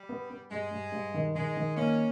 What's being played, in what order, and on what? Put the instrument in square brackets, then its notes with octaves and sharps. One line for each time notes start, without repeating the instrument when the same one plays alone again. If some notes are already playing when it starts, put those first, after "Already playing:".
Already playing: [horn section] G3
[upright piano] B3
B3
[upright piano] G2 [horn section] G#3
[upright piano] G2
G2
D#3
[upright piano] D#3 [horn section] G#3
[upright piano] D#3
[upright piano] A#3 [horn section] C#4